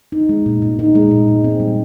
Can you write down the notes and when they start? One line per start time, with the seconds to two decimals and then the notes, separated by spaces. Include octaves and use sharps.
0.12 D#4
0.29 G#3
0.46 A#2
0.62 A#2
0.79 D#4
0.95 G#3
1.11 A#2
1.28 A#2
1.44 C4
1.60 G3